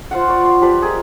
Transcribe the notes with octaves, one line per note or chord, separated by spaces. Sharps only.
F4 C5 F5 F#5
D5 C#6 D6
F5 C6
F3 G4 B4 D5
G#4 A#4 D#5